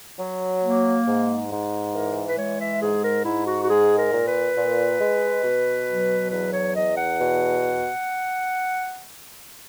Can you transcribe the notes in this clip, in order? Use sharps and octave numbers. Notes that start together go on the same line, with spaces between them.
F#3
A#3
G#2
G#2
E3 A#4
B4
G#3 C#5
E5
G#2 G#4
A#4
G#2 E4
F#4
F#4
G#3 G#4
A#4
A#2
B4
A#2
G#3
B2
F#3
E2 B4
C#5
E2 D#5
F#5
B2